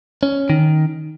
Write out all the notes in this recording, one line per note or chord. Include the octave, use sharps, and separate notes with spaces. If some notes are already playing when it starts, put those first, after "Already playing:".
C#4
D#3